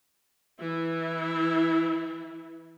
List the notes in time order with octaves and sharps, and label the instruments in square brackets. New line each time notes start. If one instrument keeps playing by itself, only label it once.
[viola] E3 E4